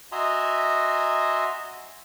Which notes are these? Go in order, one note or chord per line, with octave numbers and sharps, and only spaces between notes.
F#4 D#5 E5 G#5 A#5 C6